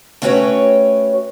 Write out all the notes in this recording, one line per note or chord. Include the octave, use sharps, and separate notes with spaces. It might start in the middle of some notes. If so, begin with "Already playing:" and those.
A3 C#4 F#4 B4 C#5 G5